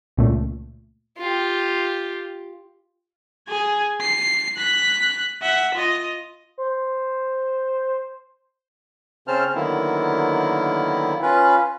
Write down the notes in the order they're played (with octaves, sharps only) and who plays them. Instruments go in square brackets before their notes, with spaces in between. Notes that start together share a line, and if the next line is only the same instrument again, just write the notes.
[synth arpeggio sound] C#2 A#2 A3
[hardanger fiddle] F4 G4
[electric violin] G#4 G#6
C7
F#6 B6
E5 F#5
F4 D#5
[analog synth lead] C5
[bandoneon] C#3 C4 C#4 C5 A5 F6
D3 D#3 F#3 A#3 B3 E4
C#4 F4 B4